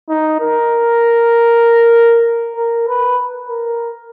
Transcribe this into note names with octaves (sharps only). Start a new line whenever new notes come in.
D#4
A#4
A#4
B4
A#4